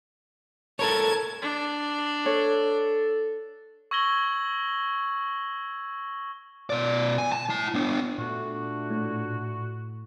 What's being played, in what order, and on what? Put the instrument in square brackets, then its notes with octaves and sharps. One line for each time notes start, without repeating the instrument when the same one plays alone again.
[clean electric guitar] A4 A#4 C#5 [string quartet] A5 G#6
[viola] D4
[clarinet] A4 [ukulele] C#5
[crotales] C#6 E6 G#6 A#6 F#7 G7
[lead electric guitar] B2 D5
G#5
A5
E4 A5
B3 D4
[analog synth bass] A#2 [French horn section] A3 D4 [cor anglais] F#4
[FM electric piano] A2